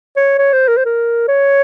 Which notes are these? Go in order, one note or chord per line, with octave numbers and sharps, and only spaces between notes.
C#5
C#5
C5
A#4
C5
A#4
C#5